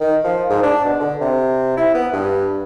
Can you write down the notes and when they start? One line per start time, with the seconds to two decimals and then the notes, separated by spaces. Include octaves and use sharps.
0.01 D#3
0.24 F3
0.49 G#2
0.63 D4
0.85 B2
1.00 D3
1.21 C3
1.77 E4
1.94 B3
2.13 G2